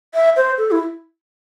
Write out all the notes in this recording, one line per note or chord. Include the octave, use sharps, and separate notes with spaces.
E5
C5
A4
E4